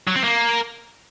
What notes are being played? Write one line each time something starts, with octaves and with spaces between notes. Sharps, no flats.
F#3
C4
A#3